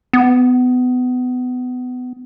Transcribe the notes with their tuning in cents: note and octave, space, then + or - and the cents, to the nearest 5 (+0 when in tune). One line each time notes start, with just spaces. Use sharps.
B3 +25